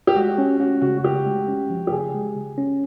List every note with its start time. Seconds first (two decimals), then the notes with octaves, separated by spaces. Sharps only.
0.07 G4
0.15 G#3 F#4
0.38 C#4
0.59 C#4 F#4
0.81 C#3 F#4
0.98 F#4
1.04 C#3 G4
1.26 G#3
1.48 C#4
1.70 F3
1.87 G4
1.92 C#3 G#4
2.14 G#3
2.36 C#3
2.58 C#4